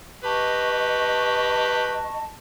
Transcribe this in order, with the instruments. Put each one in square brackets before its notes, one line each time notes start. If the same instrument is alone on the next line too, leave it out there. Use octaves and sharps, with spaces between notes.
[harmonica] G4 B4 [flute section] D#5 C#6 [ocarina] A5